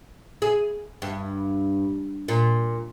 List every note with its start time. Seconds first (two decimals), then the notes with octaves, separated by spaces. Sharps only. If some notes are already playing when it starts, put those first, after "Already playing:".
0.42 G#4
1.02 G2
2.28 A#2